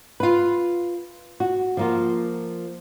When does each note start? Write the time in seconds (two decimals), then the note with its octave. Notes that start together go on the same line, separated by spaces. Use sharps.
0.20 F4 B4
1.40 F#4
1.77 F3 A#3 F4